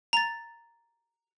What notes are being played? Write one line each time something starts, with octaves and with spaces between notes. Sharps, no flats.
A#5 A6